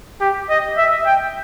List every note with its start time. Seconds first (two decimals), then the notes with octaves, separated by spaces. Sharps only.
0.21 G4
0.50 D#5
0.78 E5
1.06 G5